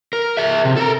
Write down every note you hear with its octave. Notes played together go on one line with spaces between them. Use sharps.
A#4
G#4 E5
C3
A4 A#4